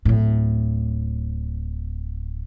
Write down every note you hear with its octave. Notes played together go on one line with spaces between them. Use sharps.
D1 A2